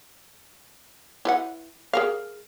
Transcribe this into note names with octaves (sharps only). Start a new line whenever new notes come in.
E4 B4 F#5
G#4 A#4 F5